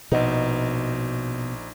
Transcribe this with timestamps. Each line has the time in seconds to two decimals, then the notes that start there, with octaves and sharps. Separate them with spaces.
0.12 A#1 B2 D#4